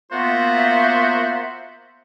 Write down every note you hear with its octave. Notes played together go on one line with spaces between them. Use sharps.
A#3 B3 F4 F#4 C5 E5